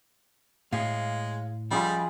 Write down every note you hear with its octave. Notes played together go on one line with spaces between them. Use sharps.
A2 G#3 C#5 F5
F3 G3 C#4 F4 G#4 B5